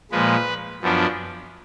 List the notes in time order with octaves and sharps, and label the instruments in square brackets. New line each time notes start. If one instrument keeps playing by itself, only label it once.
[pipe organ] A#2 F3 G#3 B4
F#2 F3 B3 D4